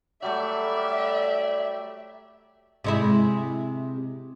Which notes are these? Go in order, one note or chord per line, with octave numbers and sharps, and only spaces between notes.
F#3 G3 A3 D5 E5
C3 G#3 E4